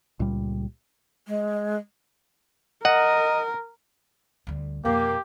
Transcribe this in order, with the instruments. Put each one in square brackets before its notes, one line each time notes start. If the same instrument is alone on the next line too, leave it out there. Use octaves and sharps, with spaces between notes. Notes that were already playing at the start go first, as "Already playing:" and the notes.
[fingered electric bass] C#2 A#2 G3
[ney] G#3
[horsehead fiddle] A#4 [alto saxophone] D#5 [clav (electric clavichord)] F#5
[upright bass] D2 G3
[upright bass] F2 B2 [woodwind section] A#3 [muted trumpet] G4